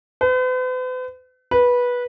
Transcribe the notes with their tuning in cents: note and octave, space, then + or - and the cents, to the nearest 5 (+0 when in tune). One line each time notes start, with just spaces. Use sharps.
B4 +45
B4 -15